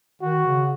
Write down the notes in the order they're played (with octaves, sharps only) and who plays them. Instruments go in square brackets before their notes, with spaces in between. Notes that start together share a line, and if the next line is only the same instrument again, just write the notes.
[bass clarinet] D#3 [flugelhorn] F#4
[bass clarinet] C#3